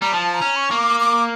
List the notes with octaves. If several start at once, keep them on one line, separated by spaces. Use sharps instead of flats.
G3 A#5
F3 A5
A#5
C#4
C#6
A#3
D6
D6